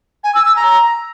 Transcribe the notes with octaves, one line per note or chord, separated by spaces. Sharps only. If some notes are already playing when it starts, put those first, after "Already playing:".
G#5
E6
E6
A#5